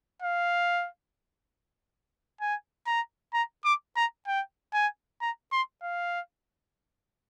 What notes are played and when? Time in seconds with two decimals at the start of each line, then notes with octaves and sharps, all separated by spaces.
0.22 F5
2.41 G#5
2.87 A#5
3.33 A#5
3.64 D6
3.96 A#5
4.27 G5
4.73 G#5
5.21 A#5
5.52 C6
5.83 F5